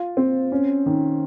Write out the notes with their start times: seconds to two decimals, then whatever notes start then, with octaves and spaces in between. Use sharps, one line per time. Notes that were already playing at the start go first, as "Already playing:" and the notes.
Already playing: F4
0.17 C4
0.52 C#4
0.86 D#3